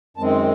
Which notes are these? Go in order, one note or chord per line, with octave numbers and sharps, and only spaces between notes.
F#2 D#3 G#3 C4 A5